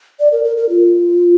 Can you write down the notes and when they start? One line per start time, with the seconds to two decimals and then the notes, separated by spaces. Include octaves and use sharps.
0.20 D5
0.32 A#4
0.44 A#4
0.57 A#4
0.69 F4